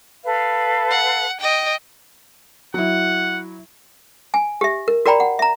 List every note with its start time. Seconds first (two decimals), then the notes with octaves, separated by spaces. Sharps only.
0.24 A4 B4 F5
0.91 F#5
1.40 D#5 G5
2.74 F#3 E4 F#5
4.34 G#5
4.61 G4 E5
4.88 A#4
5.06 F#4 A#4 D5 G5 A#5 B5
5.20 F#5
5.39 E5 A#5